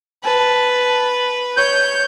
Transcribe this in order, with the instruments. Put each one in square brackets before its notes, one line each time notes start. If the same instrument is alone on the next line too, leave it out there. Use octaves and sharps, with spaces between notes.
[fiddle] B4 [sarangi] A5
[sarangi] C#5 [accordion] G6